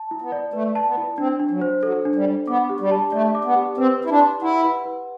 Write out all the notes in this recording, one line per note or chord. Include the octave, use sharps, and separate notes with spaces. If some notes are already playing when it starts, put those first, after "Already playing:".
Already playing: A5
E4
B3
D5
A3 B4
A5
B3
E4
C4 D4
D4
F#3
C5
F#3 A4
D4
G3
D4
B3 D6
G4
G3
A5
A3 D5
D6
B3
G4
C4 B4
B4
E4
D4
C6
E4 F#5
B4
B4